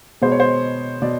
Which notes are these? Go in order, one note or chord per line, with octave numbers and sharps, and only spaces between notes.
B2 G#3 B3 C5
C#5
C5
B2 D5